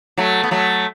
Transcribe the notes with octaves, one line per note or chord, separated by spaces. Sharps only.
F#3 A3
B3
F#3 A3